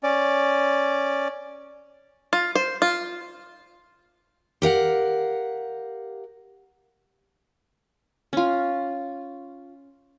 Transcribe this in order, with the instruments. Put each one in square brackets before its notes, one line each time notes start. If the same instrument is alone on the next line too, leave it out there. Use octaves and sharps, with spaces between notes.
[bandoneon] C#4 D5
[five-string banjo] F4
C5
F4
[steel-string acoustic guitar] G4 A#4 F5 F#5
[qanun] C#4 F4